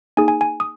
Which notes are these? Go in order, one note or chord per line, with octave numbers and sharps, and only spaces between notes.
A#3 D#4 G#4 G#5
G#5
G#5
D#6